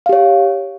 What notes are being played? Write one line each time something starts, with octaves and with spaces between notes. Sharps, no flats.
G4 C#5 F5